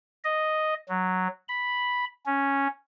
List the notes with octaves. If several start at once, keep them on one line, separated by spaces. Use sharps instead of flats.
D#5
F#3
B5
C#4